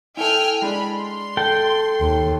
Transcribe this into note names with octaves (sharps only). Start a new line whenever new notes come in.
E4 A4 G5 G#5 F6
G#3 D4 B5
C6
A4 G5
D#2